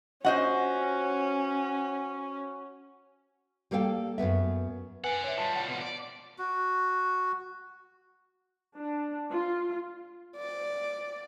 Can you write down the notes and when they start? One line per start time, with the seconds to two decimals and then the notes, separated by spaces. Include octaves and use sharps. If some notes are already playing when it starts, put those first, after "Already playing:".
0.25 C#4 F#4 C5 D#5 F#5
3.71 G3 A#3 A4 F5 G5
4.18 F#2 D#3 B3 E5
5.04 B4 D5 F#5 G#5
5.24 C#5 E5
5.38 F3 G3 A5
5.55 F#5
5.69 B2 F3
5.82 D5
6.38 F#4
8.75 D4
9.31 F4
10.37 D5